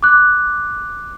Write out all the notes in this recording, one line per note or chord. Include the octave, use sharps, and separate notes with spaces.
D6 F#6